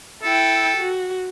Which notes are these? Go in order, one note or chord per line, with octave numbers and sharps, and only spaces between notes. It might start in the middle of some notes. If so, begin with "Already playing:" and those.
E4 A4 G5
F#4